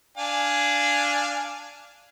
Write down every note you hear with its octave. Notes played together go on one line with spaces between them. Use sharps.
D4 F5 G#5